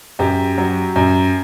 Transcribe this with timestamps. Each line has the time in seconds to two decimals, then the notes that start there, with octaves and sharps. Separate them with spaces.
0.19 F#2 G4
0.58 F#3
0.96 F#2